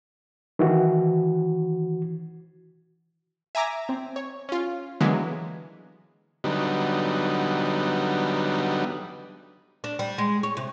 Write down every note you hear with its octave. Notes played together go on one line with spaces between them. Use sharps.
D#3 E3 F#4
E5 G#5 A#5 D6 A#6
C4
C#5
C#4 F4
D3 E3 F#3 G#3 A#3 B3
D3 F#3 G3 B3 D#4
D4
G3
G#3
C#5
C3